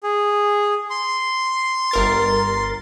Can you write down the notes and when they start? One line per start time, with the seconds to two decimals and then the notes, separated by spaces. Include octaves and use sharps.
0.03 G#4
0.90 C6
1.91 G1 A#4 A6